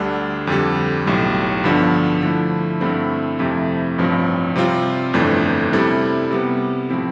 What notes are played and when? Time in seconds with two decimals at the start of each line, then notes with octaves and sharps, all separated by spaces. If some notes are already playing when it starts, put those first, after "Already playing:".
Already playing: D2 D3 G3 D4
0.47 F2 D3 G3
1.06 B1 A2 G3
1.64 G2 D3 F3 B3 D4
2.22 D3 F3 A3 E4
2.81 G2 D3 A3 C4 E4
3.39 F2 C3 F3 A3 E4
3.98 A1 G2 F3 C4
4.56 C3 G3 C4 F4
5.14 G1 F2 E3 A3 D4
5.72 C3 G3 C4 E4 A4
6.31 C3 G3 B3
6.89 A2 F3 C4 E4